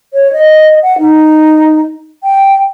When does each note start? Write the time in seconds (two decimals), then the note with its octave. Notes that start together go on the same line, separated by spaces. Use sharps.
0.14 C#5
0.33 D#5
0.83 F#5
0.99 D#4
2.24 G5